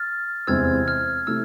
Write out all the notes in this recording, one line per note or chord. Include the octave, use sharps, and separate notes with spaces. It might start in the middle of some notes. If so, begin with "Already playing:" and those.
Already playing: F6 A6
E2 C3 E3 G#3 C4 E6 G#6
F6
C3 E3 A3 E6